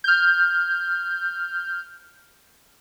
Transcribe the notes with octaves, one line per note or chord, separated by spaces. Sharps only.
F6 G6